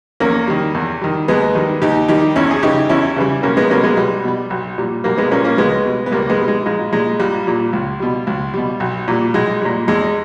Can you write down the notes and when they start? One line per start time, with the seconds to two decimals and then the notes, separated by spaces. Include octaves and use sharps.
0.20 E2 A#3 C#4
0.47 D#3 G3
0.74 E2
1.01 D#3 G3
1.28 D#2 G#3 B3
1.55 D#3 G3
1.81 D#2 D#4 G4
2.08 D#3 G3 D#4 G4
2.36 E2 C#4 E4
2.51 G#4
2.63 C#3 E3 G3 D#4 G4
2.89 E2 C#4 E4
3.16 C#3 E3 G3
3.43 B1 A#3 C#4
3.57 G#3 B3
3.70 B2 G3 A#3 C#4
3.83 G#3 B3
3.96 B1 G3
4.24 B2 G3
4.50 B1
4.78 A#2 G3
5.04 B1 G3 A#3
5.17 G#3 B3
5.31 A#2 G3 A#3 C#4
5.44 A#3 C#4
5.58 C#2 G#3 B3
5.85 B2 G3
6.06 B3
6.11 C#2 G3 A#3
6.30 G#3 B3
6.38 B2 G3
6.48 G#3
6.66 A#1 G#3
6.93 A#2 G3 G#3
7.20 A#1 G3
7.47 A#2 G3
7.73 C#2
8.00 B2 G3
8.27 C#2
8.54 B2 G3
8.80 B1
9.08 A#2 G3
9.34 B1 G#3
9.62 A#2 G3
9.88 E2 G#3